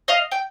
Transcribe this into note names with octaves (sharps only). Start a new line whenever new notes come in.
D#5 F5
G5